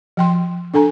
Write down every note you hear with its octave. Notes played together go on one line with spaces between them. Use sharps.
F3 G5 C6
D4 A4 G#5 A#5